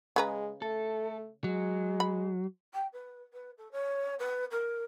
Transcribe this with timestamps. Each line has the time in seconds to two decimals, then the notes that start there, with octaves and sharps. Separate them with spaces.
0.16 C#3 G#3 B4 A#5
0.62 A3 A4
1.44 F#3 G#3
2.00 B5
2.72 G5
2.93 B4
3.33 B4
3.57 A4
3.71 C#5
4.19 B4
4.51 A#4